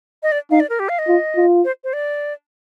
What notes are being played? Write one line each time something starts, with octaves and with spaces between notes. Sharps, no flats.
D#5
D5
D#4 F5
D5
A#4
G4
F5
D#5
F4
F4
C5
C5
D5